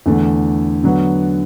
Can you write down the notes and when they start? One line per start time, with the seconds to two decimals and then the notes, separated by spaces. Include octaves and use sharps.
0.06 E2 D3 A3
0.84 D3 F#3 B3